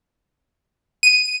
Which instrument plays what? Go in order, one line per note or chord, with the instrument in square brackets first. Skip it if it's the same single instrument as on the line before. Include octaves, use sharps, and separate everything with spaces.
[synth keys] D#7